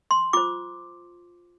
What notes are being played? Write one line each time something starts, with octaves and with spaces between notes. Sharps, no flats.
C6
F4 C5 D6